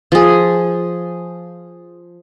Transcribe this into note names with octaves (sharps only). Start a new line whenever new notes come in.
F3 G#4